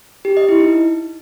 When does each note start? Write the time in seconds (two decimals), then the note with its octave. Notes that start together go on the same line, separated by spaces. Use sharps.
0.25 G4
0.37 D#5
0.49 E4
0.60 D#4